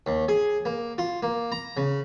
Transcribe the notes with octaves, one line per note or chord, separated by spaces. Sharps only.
D#2
G#4
A#3
F4
A#3
A#5
C#3